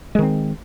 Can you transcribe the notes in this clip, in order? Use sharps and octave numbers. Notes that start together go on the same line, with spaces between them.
D#3 G#3 C4